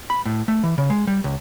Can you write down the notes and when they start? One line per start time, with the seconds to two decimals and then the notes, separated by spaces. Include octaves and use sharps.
0.10 B5
0.26 A2
0.48 A3
0.63 E3
0.78 C#3
0.90 G#3
1.07 G3
1.24 C#2